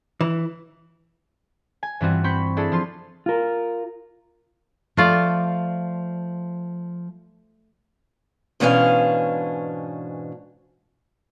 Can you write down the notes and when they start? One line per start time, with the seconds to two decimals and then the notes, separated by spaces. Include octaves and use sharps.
0.21 E3
1.83 G#5
2.00 G2 E3 G3 C4 F4 F#4
2.24 C4 B5 C#6 G6
2.57 D4 E4 G#4 A4
2.72 F3 F4 C6
3.26 F4 A#4
4.97 F3 A3 F4 D5
8.60 G#2 B2 E3 C#4 D4 F5